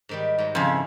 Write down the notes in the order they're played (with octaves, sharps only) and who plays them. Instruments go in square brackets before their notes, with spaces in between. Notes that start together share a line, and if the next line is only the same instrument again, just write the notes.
[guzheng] G#2 D#3 G3
G#2 F#3
[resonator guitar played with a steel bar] F2 C#3 [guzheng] E4